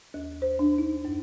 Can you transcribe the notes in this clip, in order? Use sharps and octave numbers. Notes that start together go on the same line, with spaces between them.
D#2
C5
D4
D#4
F#2